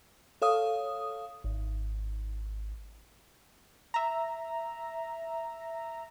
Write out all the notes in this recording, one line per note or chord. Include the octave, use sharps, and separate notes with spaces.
A4 C#5 F5 D#6
G#1
E5 A#5